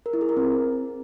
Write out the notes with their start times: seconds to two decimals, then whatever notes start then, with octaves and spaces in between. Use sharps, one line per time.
0.06 A#4
0.13 E4
0.21 G#4
0.29 A#4
0.37 C4